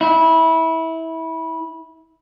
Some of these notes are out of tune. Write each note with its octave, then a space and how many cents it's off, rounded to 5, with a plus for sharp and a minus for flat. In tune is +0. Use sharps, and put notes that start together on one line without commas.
E4 -20